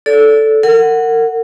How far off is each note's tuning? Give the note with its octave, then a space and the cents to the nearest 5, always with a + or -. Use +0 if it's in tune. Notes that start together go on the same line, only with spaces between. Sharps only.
A4 -5 D5 -30
A#4 -35 F#5 +0